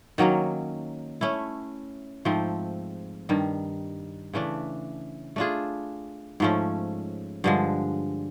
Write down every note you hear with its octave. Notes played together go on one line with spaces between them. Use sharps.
D#3 F#3 A#3 C#4
A3 C#4 E4
G#2 F3 A3 C4
G2 D#3 G3
C#3 E3 A3 D4
A3 D4 F4 G#4
G#2 F3 A3 C#4
G2 D3 F3 G#3